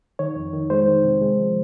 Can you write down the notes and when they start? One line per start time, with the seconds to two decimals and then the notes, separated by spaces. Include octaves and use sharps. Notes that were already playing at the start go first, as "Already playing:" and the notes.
0.19 D#3 C#5
0.36 F2
0.53 D#3
0.70 G#3 C5
0.88 D#3
1.05 C3
1.22 G#3
1.38 F3